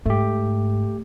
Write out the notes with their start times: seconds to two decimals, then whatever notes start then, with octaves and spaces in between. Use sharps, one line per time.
0.06 G#2 A3 G4